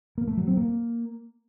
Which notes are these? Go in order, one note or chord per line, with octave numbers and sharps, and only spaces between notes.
A#3
A3
F#3
C4
A#3